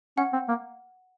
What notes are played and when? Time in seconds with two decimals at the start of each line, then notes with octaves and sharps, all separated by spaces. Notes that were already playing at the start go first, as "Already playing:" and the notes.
0.17 C#4 F#5
0.33 C4
0.48 A#3